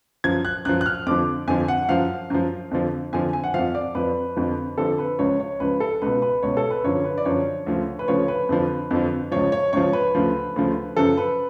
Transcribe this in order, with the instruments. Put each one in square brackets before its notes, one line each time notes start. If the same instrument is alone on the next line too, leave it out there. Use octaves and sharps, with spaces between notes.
[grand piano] F#2 F3 G#6
F#6
F#2 F3 F#6
F#6
F6
F2 D3 F3 D6
F2 D3 F3 G#5
F#5
F#2 F3 F5
F#2 F3
F2 D3 F3
F2 D3 F3 G#5
G#5
F#5
F2 F3 F5
D5
F2 F3 B4
F2 D3 F3
F2 D3 F3 A4
B4
C#2 C#3 F3 C#5
C#5
C#2 C#3 F3 B4
A4
C#2 B2 B4
B4
C#2 B2 C#5
A4
B4
F#2 D3 F3 C#5
B4
D5
F#2 D3 F3 C#5
D2 C#3 F3
B4
D2 C#3 F3 C#5
B4
F2 D3 F3
F2 D3 F3
C#2 C#3 F3 C#5
C#5
C#2 C#3 F3 C#5
B4
D2 C#3 F3
D2 C#3 F3
F#2 C#3 F3 A4
B4